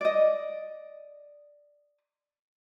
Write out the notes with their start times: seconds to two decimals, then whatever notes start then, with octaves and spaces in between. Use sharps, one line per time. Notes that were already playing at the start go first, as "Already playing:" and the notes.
0.01 D5 D#5